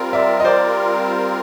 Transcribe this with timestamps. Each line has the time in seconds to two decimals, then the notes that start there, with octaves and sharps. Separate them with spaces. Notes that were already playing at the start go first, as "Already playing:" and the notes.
Already playing: G3 C4 F4 A#4
0.13 D5 E5
0.40 D#5
0.45 C5 D5